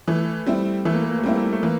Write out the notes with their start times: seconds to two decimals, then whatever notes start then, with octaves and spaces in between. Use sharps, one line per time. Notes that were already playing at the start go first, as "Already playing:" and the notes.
0.08 E3 A3
0.46 G3 C4 E4
0.85 E3 A3
0.94 A#3
1.03 A3
1.11 A#3
1.19 A3
1.23 G3 A#3 C4 E4
1.36 A3
1.45 A#3
1.53 A3
1.63 E3 A#3